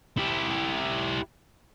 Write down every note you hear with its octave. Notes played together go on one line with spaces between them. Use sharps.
E4 G4